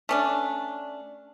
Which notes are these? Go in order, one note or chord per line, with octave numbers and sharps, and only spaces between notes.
A3 C#4 D4